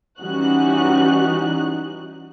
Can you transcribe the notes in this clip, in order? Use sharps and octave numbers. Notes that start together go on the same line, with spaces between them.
E3 G3 C#4 D#4 F#4 F#6